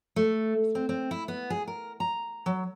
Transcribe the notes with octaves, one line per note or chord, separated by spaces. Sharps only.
A3
C4
C4
E4
B3
G#4
A#4
A#5
F#3